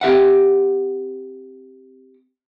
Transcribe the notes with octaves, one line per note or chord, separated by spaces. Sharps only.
C4 G4 E5 F#5